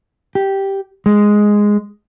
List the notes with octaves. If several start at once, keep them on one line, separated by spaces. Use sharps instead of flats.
G4
G#3